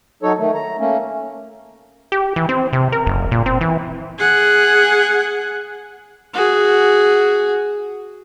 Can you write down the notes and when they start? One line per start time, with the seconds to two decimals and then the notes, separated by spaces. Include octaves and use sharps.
0.23 F#3 D#4 A4 C#5
0.39 D#3 A3
0.54 A#5
0.78 A3 A#3 C#4
2.12 G4
2.36 E3
2.49 C4
2.73 C3
2.92 A#4
3.07 F#1
3.31 A#2
3.46 C4
3.61 E3
4.18 G#4 F#5
6.33 F#4 G#4